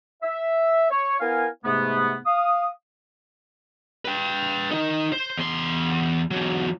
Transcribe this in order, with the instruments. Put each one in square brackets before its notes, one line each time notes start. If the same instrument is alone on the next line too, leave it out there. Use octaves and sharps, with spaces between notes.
[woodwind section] E5
C#5
B3 E4 A#4 F5 G#5
G#2 C3 A3 B3
F5 D#6
[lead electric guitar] B4 G5
D#4 A#4
C5
E2 C6
E2 F#3